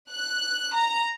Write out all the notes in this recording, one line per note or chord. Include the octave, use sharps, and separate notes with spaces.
F#6
A#5